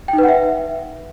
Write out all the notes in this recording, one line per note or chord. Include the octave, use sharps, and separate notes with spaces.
G5
D#4
B4
F#5
E5